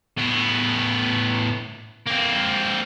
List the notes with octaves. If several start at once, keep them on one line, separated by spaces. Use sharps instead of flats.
A2 B3
A#3 C4